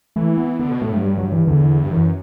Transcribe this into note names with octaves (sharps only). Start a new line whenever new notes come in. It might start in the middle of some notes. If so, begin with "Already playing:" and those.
E3 A3
B3
D3 B3
B2
A2 A3
G2 F#3
G3
F#3
E3
E2 D3
G2
F#2 E3